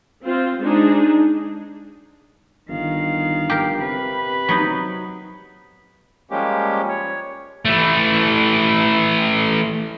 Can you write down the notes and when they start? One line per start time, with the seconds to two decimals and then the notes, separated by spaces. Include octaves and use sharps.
0.25 C4 F4 C5
0.61 G#3 D4 D#4 G#4
2.69 G1 D#3 F5
3.50 G4 A#4
3.81 C3 B4
4.49 F#3 B3 D#4
6.31 F3 G3 G#3 A#3 C#4 G4
6.89 C#5
7.65 E3 A3